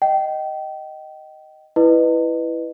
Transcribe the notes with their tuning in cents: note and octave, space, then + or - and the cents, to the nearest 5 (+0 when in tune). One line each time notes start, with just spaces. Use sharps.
D#5 +0 G5 -25
E4 +5 B4 +0 D#5 -25